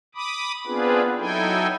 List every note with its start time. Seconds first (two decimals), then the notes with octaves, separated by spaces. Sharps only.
0.15 B5 D6 D#6
0.66 B3 C4 D4 F4 G#4 B4
1.18 F#3 D#4 E4 A4 G5 G#5